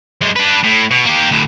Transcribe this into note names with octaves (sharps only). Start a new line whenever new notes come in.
F#2 G#3
D4 B4
A2
B2
A#3 G4
D2 A2